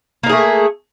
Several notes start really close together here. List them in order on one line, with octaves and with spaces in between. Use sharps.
A#3 D#4 G#4 A3